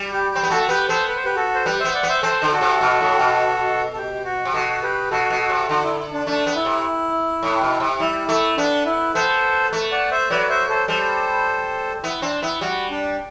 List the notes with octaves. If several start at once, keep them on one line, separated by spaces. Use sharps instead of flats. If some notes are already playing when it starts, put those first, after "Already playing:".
Already playing: G3
G4
C4 G4
B3
A3 F#4 A4
B3 G4 B4
B3 A4 C5
B4
C5
G4 B4
F#4 A4
C5
G3 G4 B4
B3 C5 E5
D5 F#5
B3
C5 E5
C4 A4 C5
D3
F#4 A4
C3
B2
A2
B2
A4
G4
F#4
C3
B2 F#4 A4
G4 B4
B2 F#4 A4
B2
F#4 A4
C3
D3 F#4
E4
D4
A3 D4
B3
E4
C3
A2
B2
C3
G3 E4
A3 E4
B3 D4
E4
B3 A4 C5
A3
D5 F#5
C5 E5
F#3 B4 D5
C5 E5
A4 C5
G3 A4 C5
B3 E4
C4 D4
B3 E4
G3 F#4
D4